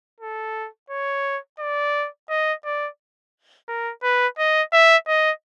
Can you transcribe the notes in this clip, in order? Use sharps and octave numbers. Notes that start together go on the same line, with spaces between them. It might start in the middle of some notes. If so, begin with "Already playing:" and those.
A4
C#5
D5
D#5
D5
A#4
B4
D#5
E5
D#5